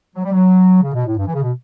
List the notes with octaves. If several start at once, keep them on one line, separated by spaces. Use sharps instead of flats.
F#3
G3
F#3
C#3
B2
A2
G2
E3
C#3
B2